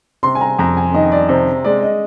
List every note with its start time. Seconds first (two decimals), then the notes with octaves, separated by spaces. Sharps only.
0.23 C3 C6
0.35 G#5
0.41 A#5
0.59 F2 A#5
0.77 G#5
0.94 D#3 D#5
1.12 D5
1.29 C3 C5
1.64 G#3 D5
1.82 D#5